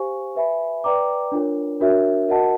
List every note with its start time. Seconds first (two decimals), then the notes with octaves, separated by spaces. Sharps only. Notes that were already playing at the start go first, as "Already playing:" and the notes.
Already playing: G4 C5 F5 G#5 C#6
0.35 B4 E5 G#5 B5
0.84 B4 D5 G5 A#5 D6
1.32 D4 F4 A#4 C#5
1.80 D4 F#4 A#4 C#5 E5
2.29 F#4 A#4 D#5 F#5 A5